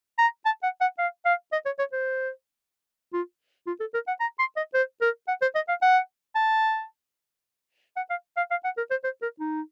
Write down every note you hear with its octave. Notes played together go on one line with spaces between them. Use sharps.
A#5
A5
F#5
F#5
F5
F5
D#5
C#5
C#5
C5
F4
F4
A4
A#4
F#5
A#5
C6
D#5
C5
A#4
F#5
C5
D#5
F5
F#5
A5
F#5
F5
F5
F5
F#5
A#4
C5
C5
A#4
D#4